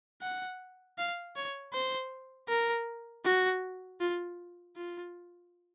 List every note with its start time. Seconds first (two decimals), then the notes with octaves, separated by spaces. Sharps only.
0.22 F#5
0.98 F5
1.36 C#5
1.73 C5
2.49 A#4
3.25 F#4
4.00 F4
4.76 F4